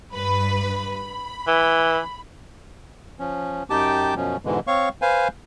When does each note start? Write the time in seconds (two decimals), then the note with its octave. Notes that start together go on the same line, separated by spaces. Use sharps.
0.13 G2 B4 B5
0.93 B5
1.47 E3
3.19 F3 C#4
3.70 F#2 D#4 G4 G5 A5 D6
4.16 F#2 B2 F3 C#4
4.45 G#2 B2 D3 E3 G#3
4.67 C4 C#5 F5 C#6
5.02 B4 C5 F5 G#5